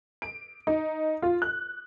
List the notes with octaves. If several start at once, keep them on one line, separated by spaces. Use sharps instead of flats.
D7
D#4
F4
F#6